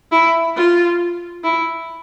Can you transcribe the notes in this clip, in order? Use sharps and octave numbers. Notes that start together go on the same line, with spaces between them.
E4
F4
E4